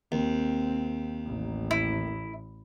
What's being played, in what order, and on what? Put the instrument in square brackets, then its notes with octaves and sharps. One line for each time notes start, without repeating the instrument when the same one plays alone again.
[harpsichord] D#2 [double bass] C4
[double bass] A1
[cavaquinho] E4